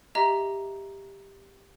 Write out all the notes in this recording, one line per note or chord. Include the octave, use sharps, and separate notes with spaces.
G4 D#5 E5 A#5